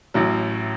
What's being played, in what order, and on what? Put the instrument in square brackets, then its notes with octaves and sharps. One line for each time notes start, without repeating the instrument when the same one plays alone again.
[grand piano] A1 A2 F#3